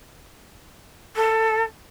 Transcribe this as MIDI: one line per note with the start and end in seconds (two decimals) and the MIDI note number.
1.16 1.62 69